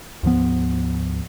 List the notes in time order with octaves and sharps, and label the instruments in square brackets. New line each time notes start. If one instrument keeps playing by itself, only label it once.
[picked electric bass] D2 G#2 F3 B3